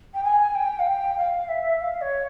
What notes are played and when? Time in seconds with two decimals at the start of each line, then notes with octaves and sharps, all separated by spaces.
0.14 G5
0.23 G#5
0.55 G5
0.79 F5
0.87 G5
1.17 F5
1.48 E5
1.80 F5
2.01 C#5